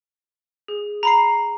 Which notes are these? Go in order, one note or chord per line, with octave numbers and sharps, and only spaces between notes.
G#4
A#5 B5 C7